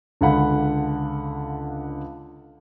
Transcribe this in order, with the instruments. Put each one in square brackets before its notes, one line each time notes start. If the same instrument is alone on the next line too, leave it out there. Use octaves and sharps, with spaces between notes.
[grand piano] C#2 D3 F5 F#5 B5